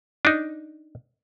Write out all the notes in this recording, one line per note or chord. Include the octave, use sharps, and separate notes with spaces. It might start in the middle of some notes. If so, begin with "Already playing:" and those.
D4 D#4